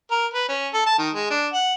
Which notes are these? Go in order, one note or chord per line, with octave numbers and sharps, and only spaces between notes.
A#4
B4
C#4
A4
A5
D#3
G#3
D4
F#5